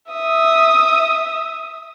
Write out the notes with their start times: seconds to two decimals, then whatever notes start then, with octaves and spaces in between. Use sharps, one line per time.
0.12 E5 D#6